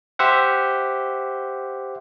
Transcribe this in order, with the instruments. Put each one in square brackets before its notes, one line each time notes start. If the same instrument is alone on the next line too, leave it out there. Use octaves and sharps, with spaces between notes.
[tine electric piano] G4 C5 E5 F#5